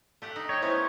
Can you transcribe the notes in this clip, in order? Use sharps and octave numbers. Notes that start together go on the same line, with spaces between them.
A3 G4 F#5
D#4
C#5 D#5 G5
B3 C#4 D#4 E4 C5